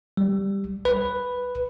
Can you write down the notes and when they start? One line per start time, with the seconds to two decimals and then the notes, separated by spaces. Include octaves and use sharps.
0.17 G3
0.85 B4